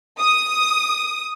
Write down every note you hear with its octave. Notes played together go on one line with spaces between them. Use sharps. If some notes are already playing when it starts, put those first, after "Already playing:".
D#6